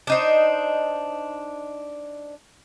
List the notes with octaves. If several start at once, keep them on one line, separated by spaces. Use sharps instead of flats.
D4 D#4 C5